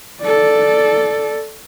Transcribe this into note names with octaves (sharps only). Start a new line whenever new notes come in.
A4 D5